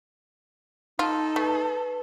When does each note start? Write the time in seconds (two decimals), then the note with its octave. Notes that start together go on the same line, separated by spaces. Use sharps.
0.99 D#4 F4 A4
1.36 A3 B4